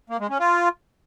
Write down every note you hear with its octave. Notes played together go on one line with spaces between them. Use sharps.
A#3
G#3
C#4
F4